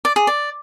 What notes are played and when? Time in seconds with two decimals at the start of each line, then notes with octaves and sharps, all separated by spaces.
0.05 D5
0.16 G#4
0.27 D5